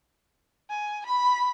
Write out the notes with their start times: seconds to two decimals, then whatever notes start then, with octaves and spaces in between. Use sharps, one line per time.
0.71 G#5
1.06 B5